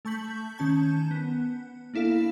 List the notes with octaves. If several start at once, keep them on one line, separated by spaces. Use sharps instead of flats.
A3 A5 C#6 G6 B6 F#7
D#3 C#4 A5 G6
B3
A#3 D4 E4 A4 F5